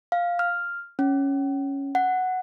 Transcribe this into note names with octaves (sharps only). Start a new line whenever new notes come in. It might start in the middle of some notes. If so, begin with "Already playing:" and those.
F5
F6
C#4
F#5